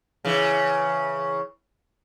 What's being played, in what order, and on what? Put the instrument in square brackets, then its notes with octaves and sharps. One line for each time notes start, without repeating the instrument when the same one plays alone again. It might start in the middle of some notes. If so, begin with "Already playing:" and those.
[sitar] C#3 E3